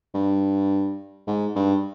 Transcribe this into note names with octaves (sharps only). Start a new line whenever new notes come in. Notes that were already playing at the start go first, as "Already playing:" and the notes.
G2
G#2
G2